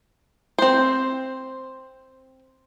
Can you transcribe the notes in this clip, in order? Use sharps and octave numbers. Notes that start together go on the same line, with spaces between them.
C4 C5